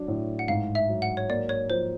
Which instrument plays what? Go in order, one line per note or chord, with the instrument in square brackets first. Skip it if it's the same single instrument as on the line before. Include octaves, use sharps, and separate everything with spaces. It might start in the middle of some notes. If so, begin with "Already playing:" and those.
Already playing: [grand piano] F#3 D4
A2
[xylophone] F#5
[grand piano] G#2 [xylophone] F5
[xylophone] E5
[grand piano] F#3
[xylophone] F#5
C#5
[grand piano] A#3 [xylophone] D5
[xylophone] C#5
[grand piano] F3 [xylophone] C5